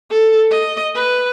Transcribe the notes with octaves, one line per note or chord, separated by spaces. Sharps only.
A4
D#5
B4